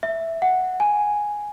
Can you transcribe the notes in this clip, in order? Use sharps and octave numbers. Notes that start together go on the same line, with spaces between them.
E5
F#5
G#5